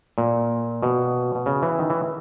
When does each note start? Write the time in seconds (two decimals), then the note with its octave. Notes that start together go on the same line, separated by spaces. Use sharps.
0.18 A#2
0.83 B2
1.35 B2
1.46 C#3
1.62 E3
1.79 D#3
1.90 E3